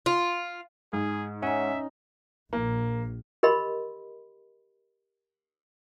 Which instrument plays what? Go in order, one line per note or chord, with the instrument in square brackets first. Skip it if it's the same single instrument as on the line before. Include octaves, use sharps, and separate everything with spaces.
[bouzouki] F4
[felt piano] G#2 [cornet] G#4
[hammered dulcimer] C#4 D#4 [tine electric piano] C#5 F#5 G#5 [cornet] E5
[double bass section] A#1 [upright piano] A#3
[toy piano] G4 A#4 D#5 B5 C6